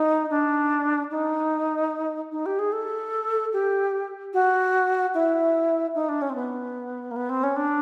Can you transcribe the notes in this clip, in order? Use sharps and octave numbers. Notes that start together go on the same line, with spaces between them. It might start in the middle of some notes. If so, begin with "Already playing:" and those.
Already playing: D#4
D4
D#4
D#4
G4
G#4
A4
G4
F#4
E4
D#4
D4
C#4
C4
B3
A#3
B3
C4
C#4
D4